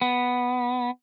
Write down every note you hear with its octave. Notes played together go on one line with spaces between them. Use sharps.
B3